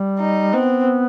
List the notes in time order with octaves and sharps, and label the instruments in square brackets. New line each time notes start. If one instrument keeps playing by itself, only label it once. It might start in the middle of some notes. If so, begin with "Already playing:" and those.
Already playing: [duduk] G3
[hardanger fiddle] D#4
[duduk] B3 [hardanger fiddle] C4